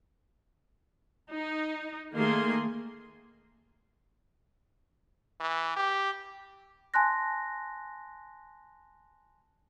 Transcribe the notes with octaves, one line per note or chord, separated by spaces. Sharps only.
D#4
D#3 A3 A#3 G#4 C6
E3
G4
G#5 A5 C6 F#6 A#6